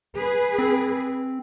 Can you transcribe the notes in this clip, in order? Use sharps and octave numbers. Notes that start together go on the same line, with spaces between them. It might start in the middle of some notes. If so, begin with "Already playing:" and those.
G#4 B4
C4